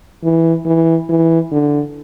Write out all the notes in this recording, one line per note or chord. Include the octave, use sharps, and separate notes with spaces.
E3
E3
E3
D3